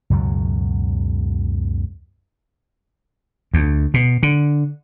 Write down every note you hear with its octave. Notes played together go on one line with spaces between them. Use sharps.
C#2 F#2 B2 F#3
D2
B2
D3